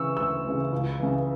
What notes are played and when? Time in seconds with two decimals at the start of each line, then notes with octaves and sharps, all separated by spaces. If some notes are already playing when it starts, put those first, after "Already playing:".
Already playing: C#3 E3 C#6 E6
0.17 D2 E6
0.45 C#3 E3
0.72 C#2
1.00 C#3 E3